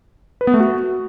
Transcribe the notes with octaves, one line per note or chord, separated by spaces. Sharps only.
B4
B3
A3
F#4